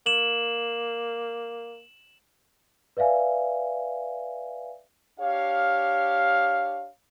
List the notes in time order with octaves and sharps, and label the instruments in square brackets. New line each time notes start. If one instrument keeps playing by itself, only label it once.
[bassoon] A#3 [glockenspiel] E7 F#7
[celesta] B4 D5 E5 F5 G#5
[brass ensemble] D4 G4 C#5 F5